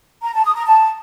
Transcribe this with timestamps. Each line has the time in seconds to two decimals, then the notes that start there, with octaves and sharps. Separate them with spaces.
0.22 A#5
0.33 A5
0.44 D#6
0.55 A#5
0.66 A5